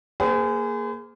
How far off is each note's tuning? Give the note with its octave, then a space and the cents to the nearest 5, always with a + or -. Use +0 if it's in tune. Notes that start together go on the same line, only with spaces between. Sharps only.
A#3 +0 G#4 +0 C5 -45